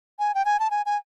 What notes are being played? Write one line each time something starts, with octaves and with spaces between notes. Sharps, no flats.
G#5
G5
G#5
A5
G#5
G#5